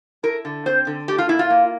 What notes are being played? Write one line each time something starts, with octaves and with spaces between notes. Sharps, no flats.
E4 A#4
D3
C4 C5
D3
A3 G4
F4
A#2 E4
F4
A#3